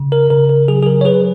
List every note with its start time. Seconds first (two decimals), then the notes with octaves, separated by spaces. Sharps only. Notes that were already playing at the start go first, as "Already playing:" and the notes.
Already playing: C#3
0.12 A#4
0.30 C#3 A#4
0.49 A#4
0.68 F#3 G#4
0.82 G#4
0.87 A#4
1.01 C#5
1.05 F#3 G#4 B4